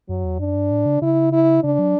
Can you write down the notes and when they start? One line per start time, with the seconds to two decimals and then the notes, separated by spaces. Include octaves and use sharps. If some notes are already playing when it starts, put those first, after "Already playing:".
0.09 F#2 F#3
0.24 E2
0.39 F#2 D4
0.55 G2
0.71 A2
0.86 C#3
1.02 C#3 E4
1.33 E4
1.64 C#3 D4
1.79 F#3